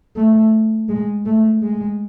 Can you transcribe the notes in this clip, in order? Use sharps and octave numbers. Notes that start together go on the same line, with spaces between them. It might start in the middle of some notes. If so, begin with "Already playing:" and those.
A3
G#3
A3
G#3